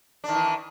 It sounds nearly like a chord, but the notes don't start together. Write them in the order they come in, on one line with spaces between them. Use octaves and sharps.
D4 D#3 E3